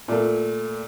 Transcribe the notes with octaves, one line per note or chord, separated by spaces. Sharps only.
A#2 A3